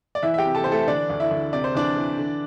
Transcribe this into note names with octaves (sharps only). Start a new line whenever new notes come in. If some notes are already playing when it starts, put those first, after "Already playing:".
D5
E3 E4 E5
E5
G4 G5
C3
A4 A5
E3 C5
A3 A4
D3 D4 D5
D2
E4 E5
D2
C3 D5
C5
E3 D4 D5
E3
D3